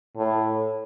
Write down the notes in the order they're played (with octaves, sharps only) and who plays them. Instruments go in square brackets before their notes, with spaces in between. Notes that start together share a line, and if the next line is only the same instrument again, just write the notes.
[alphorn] A2